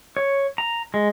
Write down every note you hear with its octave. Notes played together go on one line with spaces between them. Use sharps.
C#5
A#5
G#3